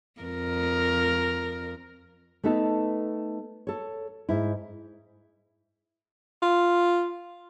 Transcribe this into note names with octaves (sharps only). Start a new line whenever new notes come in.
F2 A#4
A3 B3 D#4 A4
A4 C#5
G#2 E4
F4